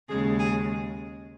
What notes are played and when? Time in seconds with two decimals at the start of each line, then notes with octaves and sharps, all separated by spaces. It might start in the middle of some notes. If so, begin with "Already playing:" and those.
0.09 D#2 C#3 G#3 G#4
0.39 G#4